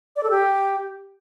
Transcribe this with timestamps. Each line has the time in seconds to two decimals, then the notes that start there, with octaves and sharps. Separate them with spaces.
0.16 D5
0.23 A4
0.30 G4